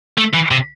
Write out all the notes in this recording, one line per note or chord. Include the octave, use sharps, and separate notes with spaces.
A3
E3
C3